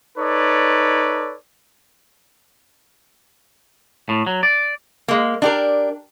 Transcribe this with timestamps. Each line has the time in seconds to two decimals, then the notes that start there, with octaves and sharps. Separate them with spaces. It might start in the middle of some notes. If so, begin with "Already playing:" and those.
0.18 D#4 A4 B4 C#5 D5
4.09 A2
4.26 F#3
4.43 D5
5.08 G#3 A#3
5.42 D4 G4 A#4